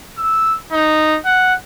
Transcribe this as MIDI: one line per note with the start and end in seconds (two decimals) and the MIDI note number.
0.18 0.54 88
0.72 1.17 63
1.25 1.54 78